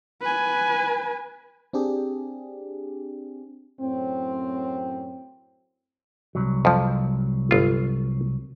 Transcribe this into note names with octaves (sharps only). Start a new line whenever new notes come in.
B4 G#5
C4 D4 G4 G#4
F#2 A2 C4
C2 F#3
F2 F3
G1 F4